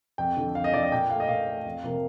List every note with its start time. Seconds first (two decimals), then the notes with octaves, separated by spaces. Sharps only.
0.18 F2 G5
0.37 D3 F3
0.55 F2 F5
0.64 D#5
0.74 D3 F3 D5
0.83 D#5
0.92 A#2 G5
1.10 A3 F5
1.20 D#5
1.29 A#2 F5
1.47 A3
1.65 F2
1.84 C3 F3 A#3